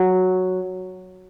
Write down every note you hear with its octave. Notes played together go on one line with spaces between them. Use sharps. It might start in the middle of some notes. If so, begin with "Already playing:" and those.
Already playing: F#3